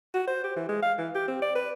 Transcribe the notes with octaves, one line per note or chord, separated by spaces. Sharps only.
F#4
C5
G4
E3
G#3
F5
E3
G4
C4
D5
B4